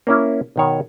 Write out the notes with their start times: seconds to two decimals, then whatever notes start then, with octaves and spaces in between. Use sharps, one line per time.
0.07 A#3 C#4 E4
0.56 B2 D#3 C#5